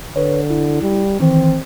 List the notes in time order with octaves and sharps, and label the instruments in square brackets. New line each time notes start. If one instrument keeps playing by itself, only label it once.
[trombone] D3 [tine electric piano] B4 C#5
[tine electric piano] E4
[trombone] G3
[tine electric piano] D#3 E3 [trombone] C4